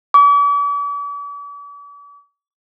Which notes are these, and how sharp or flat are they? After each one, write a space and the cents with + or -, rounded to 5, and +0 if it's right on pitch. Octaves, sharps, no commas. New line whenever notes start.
D6 -45